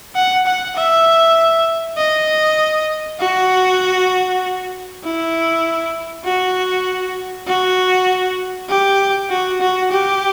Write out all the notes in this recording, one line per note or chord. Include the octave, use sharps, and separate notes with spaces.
F#5
F#5
E5
D#5
F#4
E4
F#4
F#4
G4
F#4
F#4
G4